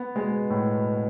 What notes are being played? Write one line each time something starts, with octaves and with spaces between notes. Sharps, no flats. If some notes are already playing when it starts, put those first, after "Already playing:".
Already playing: B3
B2 G#3
A2